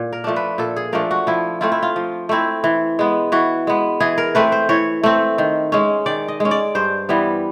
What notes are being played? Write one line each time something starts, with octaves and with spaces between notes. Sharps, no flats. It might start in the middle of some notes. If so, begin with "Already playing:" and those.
Already playing: A#2
A#4
F3 A3 D4
B4
A#2 A4
G#4
F3 A3 D4 A#4
F#4
F3 E4
A3 C4 E4 F4
E4
F4
F3
A3 C4 E4
E3
G#3 B3
E3 F#4
G#3 B3
E3 G#4
A#4
A3 C4 B4
C5
E3 C#5
A3 C4
D#3
G#3 C#4
D#3 D5
D#5
G#3 C#4
D5
G2 C5
E3 G3 B3